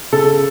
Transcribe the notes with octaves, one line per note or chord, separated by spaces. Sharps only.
C#3 A4